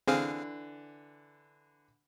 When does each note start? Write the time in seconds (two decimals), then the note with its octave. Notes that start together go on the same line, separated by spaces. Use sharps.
0.08 D3 E3 C4 G#4 F5